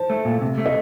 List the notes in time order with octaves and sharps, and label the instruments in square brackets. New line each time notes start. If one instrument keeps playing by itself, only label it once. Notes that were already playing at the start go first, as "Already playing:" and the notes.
Already playing: [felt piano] C5 A5
[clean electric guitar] A3
A#2
C3
A3
[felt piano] D#5